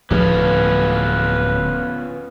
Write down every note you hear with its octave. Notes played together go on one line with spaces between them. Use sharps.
D1 F3 A3 B3 C#4 F4 B4